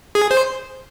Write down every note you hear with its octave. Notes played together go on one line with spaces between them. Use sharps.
G#4
C5